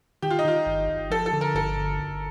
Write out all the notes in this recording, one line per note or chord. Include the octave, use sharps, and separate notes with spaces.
D#3 G4
F4
D#4
D#3 F4
G1
G1
F3 A4
A4
D3
A#4
G1 A4
D3
G1